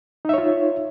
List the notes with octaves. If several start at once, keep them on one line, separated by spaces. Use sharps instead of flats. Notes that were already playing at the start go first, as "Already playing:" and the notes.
D#4 F4 C#5 E5